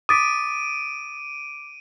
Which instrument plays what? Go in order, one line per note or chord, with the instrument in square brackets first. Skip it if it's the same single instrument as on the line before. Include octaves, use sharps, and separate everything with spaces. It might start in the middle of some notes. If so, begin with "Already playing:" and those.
[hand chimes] D6 [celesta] D#6 A6 B6 [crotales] D7 D#7